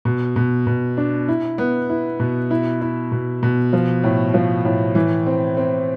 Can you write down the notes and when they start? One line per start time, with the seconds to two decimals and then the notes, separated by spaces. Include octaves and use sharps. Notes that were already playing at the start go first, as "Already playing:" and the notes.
0.05 B2
0.36 B2
0.67 B2
0.97 D4
1.28 E4
1.58 B3
1.90 E4
2.20 B2
2.51 E4
2.81 E4
3.12 B2
3.43 B2
3.73 F3
4.03 A2
4.34 F3
4.65 A2
4.95 E3
5.26 C4
5.57 C4